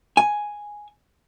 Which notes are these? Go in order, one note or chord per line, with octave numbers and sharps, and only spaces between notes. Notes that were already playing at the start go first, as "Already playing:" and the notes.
G#5